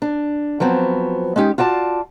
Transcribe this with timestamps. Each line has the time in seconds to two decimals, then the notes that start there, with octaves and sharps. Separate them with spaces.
0.02 D4
0.60 F3 F#3 B3 C4
1.36 G#3 C#4 D#4 G4
1.58 F4 F#4 D5 A5